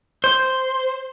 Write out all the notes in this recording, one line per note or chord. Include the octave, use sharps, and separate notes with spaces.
C5